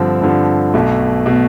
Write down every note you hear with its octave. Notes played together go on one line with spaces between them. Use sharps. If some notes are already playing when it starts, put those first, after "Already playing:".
Already playing: G2 D3 F3 C4
G2 D3 F3 C4
B1 B2 A3
B2 A3